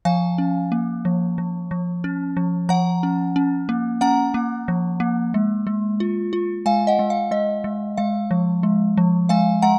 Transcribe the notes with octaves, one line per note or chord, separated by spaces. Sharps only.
F3 F5 G#5
C#4
A#3
F3
F3
F3
C#4
F3
F3 F#5 A#5
C#4
C#4
A#3
C#4 F#5 A#5
A#3
F3
A#3
G#3
G#3
F4
F4
G#3 F5 G#5
D#5 F#5
G#3
F5
G#3 D#5
G#3
G#3 F5
F3
G#3
F3
G#3 F5 G#5
G#3 F#5 A#5